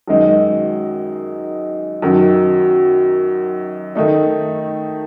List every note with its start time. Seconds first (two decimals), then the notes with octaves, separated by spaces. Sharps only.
0.08 F#2 D#3 G#3 D#4
2.02 F#2 D#3 F#3
3.95 D#3 A3 D#4